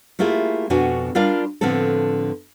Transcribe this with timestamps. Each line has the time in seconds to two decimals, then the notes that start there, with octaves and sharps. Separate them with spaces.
0.19 A3 A#3 E4 F4 G4 G#4
0.70 F2 B2 B3 D4 F#4 G#5
1.15 G3 D4 F4 A#4 D5 F5
1.61 A2 D3 F3 B3 C4 A4